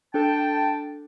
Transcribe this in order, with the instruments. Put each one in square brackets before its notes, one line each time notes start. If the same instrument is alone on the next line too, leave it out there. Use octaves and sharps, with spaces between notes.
[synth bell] D4 A4 [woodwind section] G5 A5